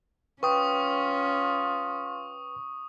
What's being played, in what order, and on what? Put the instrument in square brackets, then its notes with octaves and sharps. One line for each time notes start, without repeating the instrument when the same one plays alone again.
[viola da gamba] C#4 [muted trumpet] F4 [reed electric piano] B4 G5 [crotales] C#6 D#6